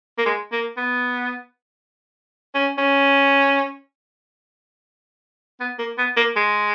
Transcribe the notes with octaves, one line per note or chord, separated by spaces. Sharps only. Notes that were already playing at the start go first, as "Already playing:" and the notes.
A#3
G#3
A#3
B3
C#4
C#4
B3
A#3
B3
A#3
G#3